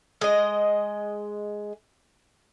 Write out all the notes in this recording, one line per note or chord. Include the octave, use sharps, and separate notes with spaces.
G#3 D#5